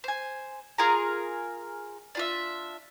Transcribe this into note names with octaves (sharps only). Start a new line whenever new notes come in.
C5 G#5
F4 G#4 A#4 A#5
D4 F4 E5